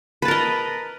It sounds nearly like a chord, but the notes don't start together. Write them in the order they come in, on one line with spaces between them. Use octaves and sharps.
B4 A5 A#4 D#5